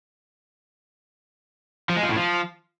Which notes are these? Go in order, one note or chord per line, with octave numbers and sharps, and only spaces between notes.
F3
G#3
F3
A2
F3